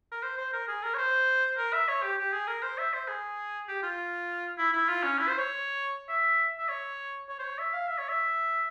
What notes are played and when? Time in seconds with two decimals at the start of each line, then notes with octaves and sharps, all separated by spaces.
0.12 A#4
0.23 C5
0.38 C5
0.53 A#4
0.68 G#4
0.83 A#4
0.94 C#5
0.98 C5
1.58 A#4
1.73 E5
1.89 C#5
2.03 G4
2.19 G4
2.33 G#4
2.48 A#4
2.63 C5
2.78 E5
2.94 C5
3.08 G#4
3.68 G4
3.83 F4
4.58 E4
4.73 E4
4.89 F4
5.03 C#4
5.19 E4
5.29 C5
5.38 C#5
6.09 E5
6.58 E5
6.69 C#5
7.29 C#5
7.39 C5
7.44 C#5
7.59 E5
7.73 F5
7.88 E5
7.98 C#5
8.09 E5